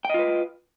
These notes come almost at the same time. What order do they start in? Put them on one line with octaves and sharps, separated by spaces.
G5 D#5 F4 B4